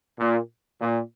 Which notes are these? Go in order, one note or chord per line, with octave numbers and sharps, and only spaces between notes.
A#2
A#2